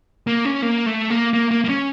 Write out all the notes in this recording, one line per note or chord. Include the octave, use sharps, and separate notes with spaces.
A#3
C#4
A#3
A3
A#3
A#3
A#3
A#3
C#4